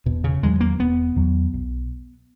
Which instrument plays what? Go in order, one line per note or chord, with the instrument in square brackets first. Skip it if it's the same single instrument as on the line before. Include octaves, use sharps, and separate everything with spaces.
[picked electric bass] E1 [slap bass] B2
[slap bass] C#3
[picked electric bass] E2 D#3 F#3 [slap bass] G#3
[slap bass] A#3
[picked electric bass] E1 [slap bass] B3
[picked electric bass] E2 D#3 F#3
B1